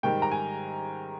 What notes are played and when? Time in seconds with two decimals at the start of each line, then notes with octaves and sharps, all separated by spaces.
0.03 G#2 D#3 G3 G5
0.22 A#5
0.32 G#5